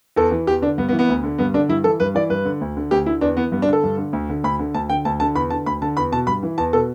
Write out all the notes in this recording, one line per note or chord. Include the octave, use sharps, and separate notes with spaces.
E2 A4
E3
E2 G4
D3 D4
G2 B3
B3
E3
B3
D2
D3
G2 B3
D3 D4
G2 E4
E3 A4
G2 B4
E3 D5
G2 B4
D3
D2
D3
D2 G4
D3 E4
E2 D4
E3 B3
G2 B3
D4
D3 A4
G2
D3
D2
D3
D2 B5
D3
D2 A5
D3 G5
D2 A5
D3 A5
E2 B5
D3 A5
D2 B5
D3 A5
E2 B5
B2 A5
G2 B5
E3
E2 A5
B2 A4